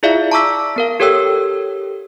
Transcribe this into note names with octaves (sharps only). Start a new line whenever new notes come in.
E4 F4 G#4 D5 E5 F5
A5 A#5 C#6 D6 E6 B6
B3 A#4 F5
G4 A4 A#4 C#5 G5 E6